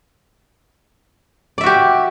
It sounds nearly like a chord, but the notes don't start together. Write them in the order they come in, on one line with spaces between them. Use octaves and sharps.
D5 E5 F#4 G4